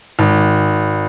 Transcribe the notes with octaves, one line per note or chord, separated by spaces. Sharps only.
G#1